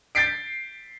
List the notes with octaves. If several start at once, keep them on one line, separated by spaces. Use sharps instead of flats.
G6 A6 B6 C7 D7